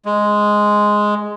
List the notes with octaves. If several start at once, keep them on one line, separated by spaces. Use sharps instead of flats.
G#3